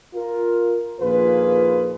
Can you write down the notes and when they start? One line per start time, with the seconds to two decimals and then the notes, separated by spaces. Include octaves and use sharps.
0.15 F4 A#4
1.00 A#1 D#2 A#3 F4 G#4 B4